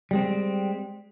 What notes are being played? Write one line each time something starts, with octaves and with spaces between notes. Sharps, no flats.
G3 G#3 C4